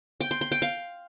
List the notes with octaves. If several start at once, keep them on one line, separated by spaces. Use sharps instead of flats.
G5
C6
C6
G5
F5